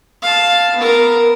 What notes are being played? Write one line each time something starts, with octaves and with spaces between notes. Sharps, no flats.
F5 A5
B3 A#4